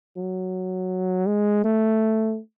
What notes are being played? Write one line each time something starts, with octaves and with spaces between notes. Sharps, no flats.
F#3
G#3
A3